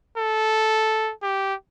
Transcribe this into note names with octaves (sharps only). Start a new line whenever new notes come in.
A4
G4